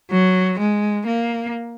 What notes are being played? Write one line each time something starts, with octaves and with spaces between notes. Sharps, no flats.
F#3
G#3
A#3